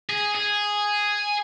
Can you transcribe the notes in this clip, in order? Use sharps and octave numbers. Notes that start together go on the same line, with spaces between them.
G#4
G#4